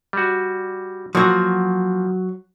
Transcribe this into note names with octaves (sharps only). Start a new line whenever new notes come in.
G3 F#4
F3 F#3 A#3 F#4